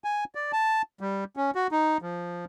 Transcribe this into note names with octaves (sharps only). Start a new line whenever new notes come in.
G#5
D5
A5
G3
C#4
F#4
D#4
F3